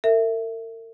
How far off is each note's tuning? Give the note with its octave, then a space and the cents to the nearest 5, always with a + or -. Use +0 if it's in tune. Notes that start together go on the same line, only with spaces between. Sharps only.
A#4 -45 E5 +0